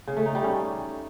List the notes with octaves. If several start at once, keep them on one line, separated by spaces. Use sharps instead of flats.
C#3
A3
D#4
G3
C#4